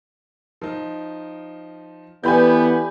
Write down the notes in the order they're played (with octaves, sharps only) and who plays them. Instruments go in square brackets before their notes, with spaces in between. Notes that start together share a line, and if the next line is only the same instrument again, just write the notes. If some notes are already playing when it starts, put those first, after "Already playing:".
[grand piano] F3 D#4
[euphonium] E3 [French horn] B3 [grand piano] G4 A4 D5 [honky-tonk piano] G#5 B5 G6